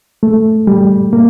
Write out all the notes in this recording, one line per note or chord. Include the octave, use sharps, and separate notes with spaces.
A3
G3
A#3